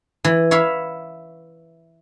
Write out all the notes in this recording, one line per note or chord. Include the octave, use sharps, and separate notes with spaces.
E3
C#5 E5 F5 B5